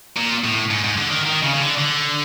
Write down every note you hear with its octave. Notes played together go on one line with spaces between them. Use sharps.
A#2
A2
G#2
G#2
D3
D#3
D#3
C#3
C#3
D3
D3